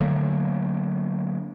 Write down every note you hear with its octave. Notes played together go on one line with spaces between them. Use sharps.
D3 F#3 A3 A#3